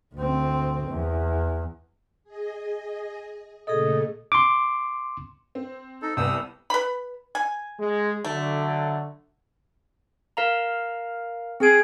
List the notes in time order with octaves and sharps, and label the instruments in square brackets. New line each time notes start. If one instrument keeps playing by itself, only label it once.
[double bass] D2 C4
E2
[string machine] G#4 D#5
[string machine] A#2 C#3 A3 [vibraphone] G#4 A4 [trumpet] D#5
[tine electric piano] C6 D6
[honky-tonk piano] C4
[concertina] D#4 A4
[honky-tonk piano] C2 B3 [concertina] D#6 E6
[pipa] B4 B5
G#5
[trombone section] G#3
[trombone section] D3 F#3 [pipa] A3
[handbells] A#4 F5 A#5
[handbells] C4 D7 [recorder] G#4